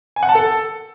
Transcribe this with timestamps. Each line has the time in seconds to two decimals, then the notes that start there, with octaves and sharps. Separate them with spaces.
0.16 G#5
0.23 F#5
0.29 A5
0.35 A4